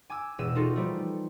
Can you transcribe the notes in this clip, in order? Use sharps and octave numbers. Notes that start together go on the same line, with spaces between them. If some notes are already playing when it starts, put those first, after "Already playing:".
G#5 D6 E6
E1 E6 D#7 E7
D#4 F4 F#4 A4
F3 G3 A3